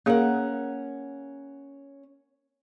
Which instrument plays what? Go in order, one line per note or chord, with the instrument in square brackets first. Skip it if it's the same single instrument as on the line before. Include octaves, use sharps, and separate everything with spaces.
[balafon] A#3 G#4 F5 [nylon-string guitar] C#4 A#4 F#5